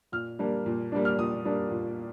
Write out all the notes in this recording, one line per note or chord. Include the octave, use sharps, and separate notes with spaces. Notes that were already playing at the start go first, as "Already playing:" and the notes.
A#2 F6
G3 A#3 D4
A#2
G3 A#3 D4
F6
A#2 D#6
G3 A#3 D4
A#2